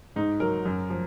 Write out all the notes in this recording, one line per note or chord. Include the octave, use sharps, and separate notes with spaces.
G#2 D#4
F#3 A#4
F#2
F3